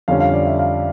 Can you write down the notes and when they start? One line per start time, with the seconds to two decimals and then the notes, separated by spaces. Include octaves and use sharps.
0.08 F2 D3 G3 C#4 F5
0.20 F5
0.34 D5
0.47 E5
0.59 F5